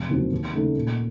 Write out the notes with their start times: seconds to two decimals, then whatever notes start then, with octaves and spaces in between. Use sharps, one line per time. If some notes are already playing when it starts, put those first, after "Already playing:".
Already playing: F1
0.09 D#2 D#3 F#3 C4
0.32 D#2
0.53 C#3 A3 D#4 A4
0.75 A#2